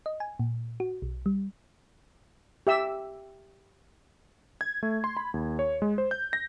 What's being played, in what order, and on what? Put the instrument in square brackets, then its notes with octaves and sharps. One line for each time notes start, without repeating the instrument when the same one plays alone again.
[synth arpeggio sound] D#5
G#5
A#2
F#4
B1
G3
[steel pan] G4 E5 E6
[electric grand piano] G#6
A3
C6
B5
D#2
C#5
G#3
C5
G6
A#6